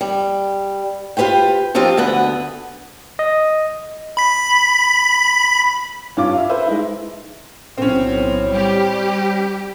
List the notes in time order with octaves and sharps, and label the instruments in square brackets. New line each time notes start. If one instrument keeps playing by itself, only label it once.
[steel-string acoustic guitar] G3
F4 G4 B4 C5 G5
F3 C4 D#4 F4 G4
D2 D3 B3 B4
[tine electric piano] D#5
[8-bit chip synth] B5 B6
[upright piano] G2 C#4 F4 D6
E5 F5
A4 B4 C5 E5
G#3 D#4 E4
[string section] B1 [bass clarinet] A2 [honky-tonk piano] C4 C#4
[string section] G3 G4